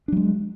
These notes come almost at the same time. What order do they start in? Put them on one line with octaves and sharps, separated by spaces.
D4 F#3 G#3